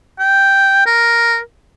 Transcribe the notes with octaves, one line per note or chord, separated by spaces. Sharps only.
G5
A#4